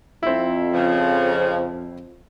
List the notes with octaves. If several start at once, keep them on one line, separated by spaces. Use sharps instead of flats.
F2 C4 E4
C#3 F3